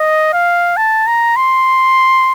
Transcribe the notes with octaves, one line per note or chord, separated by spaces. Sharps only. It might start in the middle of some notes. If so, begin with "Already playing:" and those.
Already playing: D#5
F5
A5
A#5
C6